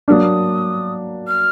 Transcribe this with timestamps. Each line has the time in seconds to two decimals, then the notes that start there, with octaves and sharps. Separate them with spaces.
0.08 F#3 A#3 D4 D#6 F6
1.28 F6